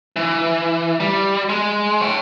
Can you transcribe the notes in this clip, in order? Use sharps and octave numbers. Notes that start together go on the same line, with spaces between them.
E3
G3
G#3
C#5 G5